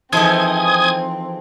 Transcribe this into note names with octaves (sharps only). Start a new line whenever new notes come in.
E3 F3 C4 D#4 G#4 A4 D#6 G#6